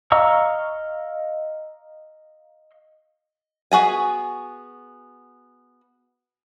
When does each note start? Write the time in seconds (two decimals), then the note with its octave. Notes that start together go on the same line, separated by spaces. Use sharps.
0.12 D#5 F5 A#5 C#6 E6
3.72 B3 F#4 G#4 G#5